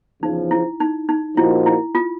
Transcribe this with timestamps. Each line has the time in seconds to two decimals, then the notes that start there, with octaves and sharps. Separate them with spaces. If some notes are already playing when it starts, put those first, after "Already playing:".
0.22 E2 C#3 F3 D#4
0.51 E4
0.80 D#4
1.09 D#4
1.37 A#2 F3 A#3 D#4 E4 F#4
1.66 E4
1.95 F4